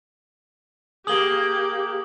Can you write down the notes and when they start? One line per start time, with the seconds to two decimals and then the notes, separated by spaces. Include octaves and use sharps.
1.07 A#3 G4 G#4 D#6 F#7 G7